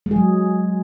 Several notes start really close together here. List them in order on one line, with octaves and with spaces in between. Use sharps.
G#3 G#4 F#3